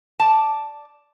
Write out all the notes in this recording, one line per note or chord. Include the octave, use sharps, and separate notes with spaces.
D5 A5